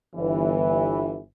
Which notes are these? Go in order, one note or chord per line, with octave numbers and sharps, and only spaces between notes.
G1 E3